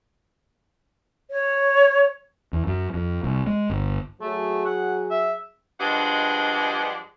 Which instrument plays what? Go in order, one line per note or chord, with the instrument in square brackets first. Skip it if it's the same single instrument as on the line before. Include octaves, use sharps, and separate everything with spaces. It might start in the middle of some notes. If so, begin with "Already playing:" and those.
[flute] C#5
[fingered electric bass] E2
F#2
F2
C2
G#3
G1
[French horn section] F#3 G#4 [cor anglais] A3
[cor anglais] F#5
E5
[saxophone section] G2 F3 G#3 D4 D#5 F#5